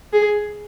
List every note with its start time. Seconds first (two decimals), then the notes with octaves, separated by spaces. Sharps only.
0.13 G#4